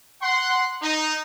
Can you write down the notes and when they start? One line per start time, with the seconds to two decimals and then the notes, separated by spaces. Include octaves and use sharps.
0.22 F#5 C6
0.82 D#4